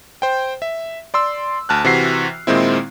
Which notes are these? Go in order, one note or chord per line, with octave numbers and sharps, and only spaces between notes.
C5 G5
E5
D5 C6 E6
D2 A5 F6 F#6
C3 E3 F#4 C7
A#2 D#3 G#3 C4 E4